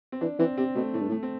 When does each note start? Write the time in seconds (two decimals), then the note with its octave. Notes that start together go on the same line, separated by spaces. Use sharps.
0.12 C4
0.21 E3 D4
0.39 E3 C4
0.58 C3 C4
0.75 B2 A3
0.94 A2 A3
1.01 G2
1.09 A2
1.12 A3
1.23 C4